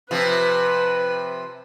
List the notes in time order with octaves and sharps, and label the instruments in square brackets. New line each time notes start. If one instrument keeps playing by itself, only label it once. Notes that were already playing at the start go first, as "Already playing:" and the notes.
[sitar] C3 F3 [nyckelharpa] B4